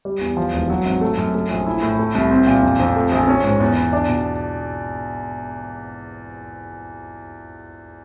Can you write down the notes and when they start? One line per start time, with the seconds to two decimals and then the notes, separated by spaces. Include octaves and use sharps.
0.05 G3
0.21 E2
0.37 F3
0.53 E1
0.70 F#3
0.86 G#1
1.01 A3
1.17 F#2
1.35 A3
1.50 A#1
1.66 E4
1.82 A2
1.99 A3
2.15 C2
2.31 C4
2.47 A#2
2.63 F2
2.80 F2
2.96 A3
3.12 A#1
3.28 C#4
3.44 G#2
3.60 E2
3.76 E2
3.93 D4
4.09 B2